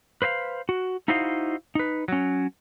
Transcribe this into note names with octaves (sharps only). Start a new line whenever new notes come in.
B4 C5 D#5 F5
F#4
D#4 E4 F#4 C5 D#5 F5
D#4 B4
F#3 C#4